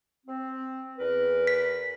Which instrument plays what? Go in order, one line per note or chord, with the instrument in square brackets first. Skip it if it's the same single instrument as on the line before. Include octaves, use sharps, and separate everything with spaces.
[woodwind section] C4
E2 A#4 B4
[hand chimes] B6